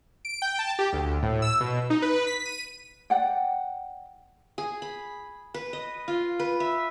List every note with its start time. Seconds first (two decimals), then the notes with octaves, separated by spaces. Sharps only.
0.25 D7
0.42 G5
0.59 A5
0.79 G4
0.93 D2
1.23 A2
1.42 E6
1.60 B2
1.90 D#4
2.02 B4
2.27 B6
2.45 D#7
3.10 D5 F#5 G5
4.58 G#4
4.82 B5
5.54 B4
5.73 D#5
6.08 F4
6.40 B4
6.60 E5